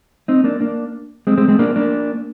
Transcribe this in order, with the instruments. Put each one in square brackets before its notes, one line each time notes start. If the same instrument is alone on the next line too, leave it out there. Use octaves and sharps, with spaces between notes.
[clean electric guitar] C4 D#4
A#3 D4
A#3 D4
G#3 C4
G#3 C4
G#3 C4
A#3 D4
A#3 D4